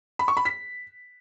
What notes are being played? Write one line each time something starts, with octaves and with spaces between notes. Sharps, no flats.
B5
C#6
B5
B6